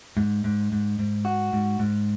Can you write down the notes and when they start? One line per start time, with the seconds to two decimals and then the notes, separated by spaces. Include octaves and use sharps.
0.17 G#2
0.44 G#2
0.72 G#2
0.99 G#2
1.25 F#4
1.53 G#2
1.79 G#2